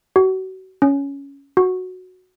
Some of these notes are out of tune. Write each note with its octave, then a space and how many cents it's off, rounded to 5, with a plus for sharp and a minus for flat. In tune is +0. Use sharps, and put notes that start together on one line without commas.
F#4 +35
C#4 +10
F#4 -5